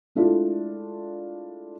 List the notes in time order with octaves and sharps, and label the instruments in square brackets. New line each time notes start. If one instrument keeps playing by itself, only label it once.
[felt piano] G#3 A3 D4 E4 F4